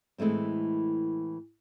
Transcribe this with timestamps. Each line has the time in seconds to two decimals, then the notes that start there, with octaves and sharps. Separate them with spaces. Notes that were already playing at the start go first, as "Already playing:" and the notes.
0.18 A2 E3 G#3 A3 C4